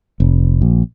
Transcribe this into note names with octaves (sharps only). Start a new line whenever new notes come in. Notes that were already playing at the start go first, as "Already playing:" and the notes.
F1
A#1